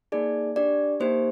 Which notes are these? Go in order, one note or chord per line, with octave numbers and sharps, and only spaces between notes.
A#3 D#4 G#4 D5
D4 G4 D5
A#3 D#4 G4 C5